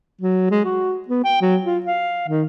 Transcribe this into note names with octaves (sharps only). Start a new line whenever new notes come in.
F#3
G#3
F#4
B3
G5
F#3
F4
F5
D#3